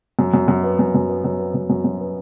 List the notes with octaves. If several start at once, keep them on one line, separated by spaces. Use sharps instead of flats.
F#2
F#2
F#2
B3
F#2
F#2
B3
F#2
B3
F#2
F#2
F#2
B3